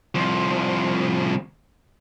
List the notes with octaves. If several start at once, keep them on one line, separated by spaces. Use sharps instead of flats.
C2 F3